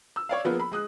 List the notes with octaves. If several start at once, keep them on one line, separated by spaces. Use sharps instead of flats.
E6
C#5 D5 F5
F3 A#3 B3 F4 G#4
B5
G#3 D#6 F#6